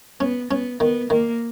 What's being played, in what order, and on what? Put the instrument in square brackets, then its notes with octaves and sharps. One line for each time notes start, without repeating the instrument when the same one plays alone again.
[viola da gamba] B3 [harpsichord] C#4
[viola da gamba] B3 [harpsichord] C#4
[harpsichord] D#3 [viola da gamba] B3
[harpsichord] D#3 [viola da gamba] A#3